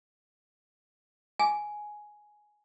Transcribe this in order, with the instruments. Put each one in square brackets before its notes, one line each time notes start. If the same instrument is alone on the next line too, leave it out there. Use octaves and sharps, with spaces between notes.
[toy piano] G#5